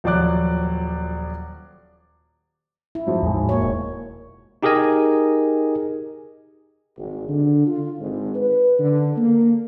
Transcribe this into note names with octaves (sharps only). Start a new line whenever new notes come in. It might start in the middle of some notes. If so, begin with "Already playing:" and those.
D#1 F3 F#3 D5 D6 F#6
E4
G#2 F3 F#3
E2 A2 G#3
A#3 C#5
E1
D#4 G4 G#4 A#4 D#5 G#5
G#1
D3
F4
G#1
B4
D3
A#3